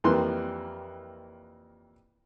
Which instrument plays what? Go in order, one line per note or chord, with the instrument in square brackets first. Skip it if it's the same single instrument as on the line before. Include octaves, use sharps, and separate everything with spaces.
[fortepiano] F2 E3 G3 A#3 C6